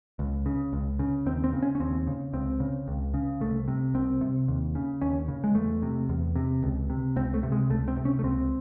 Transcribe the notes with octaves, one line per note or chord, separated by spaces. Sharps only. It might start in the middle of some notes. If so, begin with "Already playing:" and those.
C#2
C#3
C#2
C#3
D#2 C4
C4
C#3
C#4
C#4
D#2 C4
C#3
C#2 C4
C#3
C#2
C#3
C2 A3
C3
C2 C4
C3
D#2
C#3
D#2 C#4
C#3
G#3
E2 A3
C3
E2
C3
C#2
C3
C#2 C4
A3
C3
G#3
C#2 A3
C4
C3
C#4
A3
C#2 C4